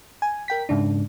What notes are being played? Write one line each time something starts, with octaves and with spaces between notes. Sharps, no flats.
G#5
A#4 G5 B6
G#2 C#3 D4